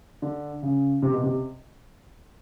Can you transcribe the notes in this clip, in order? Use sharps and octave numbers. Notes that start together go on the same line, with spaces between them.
D3
C#3
C3
B2
C3